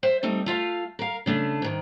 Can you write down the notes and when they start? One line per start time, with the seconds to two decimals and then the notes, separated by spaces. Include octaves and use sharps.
0.03 C5 E5
0.23 G3 A3 C4 D#4
0.46 A3 F4 F5
0.99 A#4 F5
1.26 C#3 A3 D4
1.62 G#2 D#3